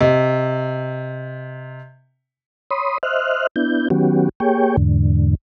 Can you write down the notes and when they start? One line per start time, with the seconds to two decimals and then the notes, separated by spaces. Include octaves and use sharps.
0.01 C3 D#5
2.71 C#5 B5 C6 D#6
3.03 C5 D#5 E5 F6 F#6
3.56 B3 D4 E4 G6
3.90 D#3 F#3 B3 C#4 F#4 G4
4.40 A#3 G4 G#4 C#5 G5
4.77 E2 G#2 D3